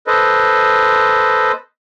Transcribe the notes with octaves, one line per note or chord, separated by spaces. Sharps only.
A4 B4 C5 D#5